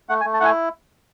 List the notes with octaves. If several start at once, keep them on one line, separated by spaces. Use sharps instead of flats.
A3 F#5
G#5
A3
A5
E4 F#5 G#5